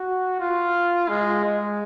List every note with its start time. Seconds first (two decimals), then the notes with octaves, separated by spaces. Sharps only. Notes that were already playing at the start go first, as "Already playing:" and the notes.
Already playing: F#4
0.40 F4
1.09 G#3
1.44 G#3